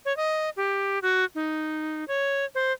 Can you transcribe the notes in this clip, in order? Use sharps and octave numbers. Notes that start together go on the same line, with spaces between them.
C#5
D#5
G4
F#4
D#4
C#5
C5